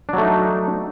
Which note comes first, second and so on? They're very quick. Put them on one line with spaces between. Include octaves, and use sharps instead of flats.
D4 F#3 A3 D#4